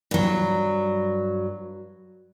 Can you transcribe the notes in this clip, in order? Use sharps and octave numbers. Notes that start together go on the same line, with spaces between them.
G2 F#3